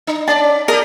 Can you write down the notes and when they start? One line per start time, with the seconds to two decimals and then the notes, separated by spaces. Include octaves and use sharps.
0.07 D4
0.28 C#4 D5 A5
0.68 G4 A#4 D#5